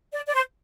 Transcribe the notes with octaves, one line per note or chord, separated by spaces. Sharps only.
D5
D5
C5